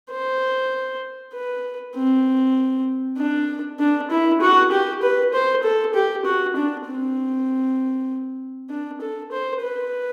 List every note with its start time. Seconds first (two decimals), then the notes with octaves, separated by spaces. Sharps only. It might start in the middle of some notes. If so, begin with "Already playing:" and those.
0.11 C5
1.34 B4
1.96 C4
3.18 D4
3.79 D4
4.10 E4
4.41 F#4
4.72 G4
5.02 B4
5.33 C5
5.63 A4
5.94 G4
6.25 F#4
6.56 D4
6.86 C4
8.70 D4
9.01 A4
9.32 C5
9.62 B4